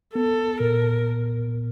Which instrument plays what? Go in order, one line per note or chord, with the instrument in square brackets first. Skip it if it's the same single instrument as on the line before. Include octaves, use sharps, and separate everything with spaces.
[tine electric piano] B3 [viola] A4
[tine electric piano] A#2 [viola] A#4